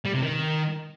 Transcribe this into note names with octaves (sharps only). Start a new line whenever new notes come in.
G3
C3
D#3